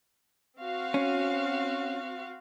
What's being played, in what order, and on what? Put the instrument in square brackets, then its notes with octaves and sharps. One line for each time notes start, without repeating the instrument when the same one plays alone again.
[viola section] C4 F#4 F5
[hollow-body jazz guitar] C#4